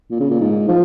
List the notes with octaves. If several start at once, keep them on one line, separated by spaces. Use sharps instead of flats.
A#2
C#3
A#2
G#2
F3